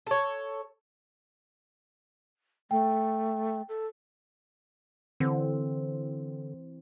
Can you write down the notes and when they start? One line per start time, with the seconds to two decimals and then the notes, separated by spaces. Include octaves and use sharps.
0.07 A4 C#5
2.71 A3 G5
3.69 A4
5.20 D3 E3 C4